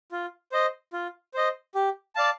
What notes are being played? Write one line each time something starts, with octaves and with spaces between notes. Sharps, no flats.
F4
C5 D#5
F4
C5 D#5
G4
D5 F5 A5